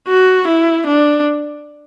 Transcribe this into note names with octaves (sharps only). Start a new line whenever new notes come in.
F#4
E4
D4